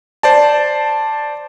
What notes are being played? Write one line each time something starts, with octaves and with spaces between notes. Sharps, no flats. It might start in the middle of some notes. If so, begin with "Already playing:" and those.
C5 D5 A5